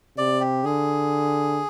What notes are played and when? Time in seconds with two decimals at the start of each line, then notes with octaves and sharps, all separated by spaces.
0.17 C3 D5
0.40 G4
0.64 D3 G#4